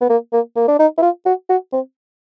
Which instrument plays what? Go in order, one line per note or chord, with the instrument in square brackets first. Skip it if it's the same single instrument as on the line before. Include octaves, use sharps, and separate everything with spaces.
[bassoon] B3
A#3
A#3
A#3
D4
D#4
E4
F4
F#4
F#4
C4